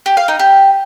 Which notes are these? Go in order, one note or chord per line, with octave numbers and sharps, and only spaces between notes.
G4
F5
D#4
G4